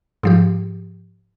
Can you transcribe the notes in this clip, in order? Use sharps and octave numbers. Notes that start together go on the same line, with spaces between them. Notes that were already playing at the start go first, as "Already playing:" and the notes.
G#2 F3 G4